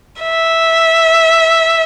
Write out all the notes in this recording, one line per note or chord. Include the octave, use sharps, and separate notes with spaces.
E5